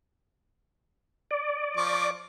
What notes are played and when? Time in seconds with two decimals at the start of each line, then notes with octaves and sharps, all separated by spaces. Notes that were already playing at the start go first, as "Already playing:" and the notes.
1.31 D5
1.77 F3 C#6 D6